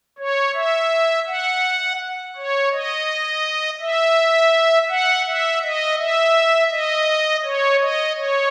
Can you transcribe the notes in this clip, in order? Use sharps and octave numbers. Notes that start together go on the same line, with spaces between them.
C#5
E5
F#5
C#5
D#5
E5
F#5
E5
D#5
E5
D#5
C#5
D#5
C#5